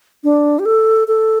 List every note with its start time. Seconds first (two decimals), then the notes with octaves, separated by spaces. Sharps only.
0.24 D4
0.59 G4
0.66 A4
1.08 A4